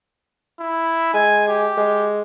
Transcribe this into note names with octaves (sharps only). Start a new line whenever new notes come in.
E4
G#3 G#5
G4
G#3